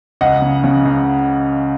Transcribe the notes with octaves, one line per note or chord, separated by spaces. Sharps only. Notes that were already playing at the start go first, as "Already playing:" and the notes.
C#2 D#5 F#5
C#3
C#3
C#2